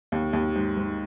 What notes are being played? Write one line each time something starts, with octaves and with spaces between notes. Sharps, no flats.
D#2
D#2
G#2
G#2